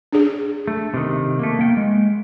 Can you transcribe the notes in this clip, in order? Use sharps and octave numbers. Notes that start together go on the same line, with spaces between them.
D4 G#4
A3
C3 D#3
A3 A#3
A#3 G5
G#3